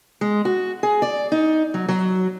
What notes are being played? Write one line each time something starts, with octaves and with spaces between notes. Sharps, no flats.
G#3
F#4
G#4
D5
D#4
F#3
F#3